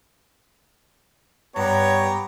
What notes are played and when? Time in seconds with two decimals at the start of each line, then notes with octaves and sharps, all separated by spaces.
1.56 G2 B3 G4 C#5 A#5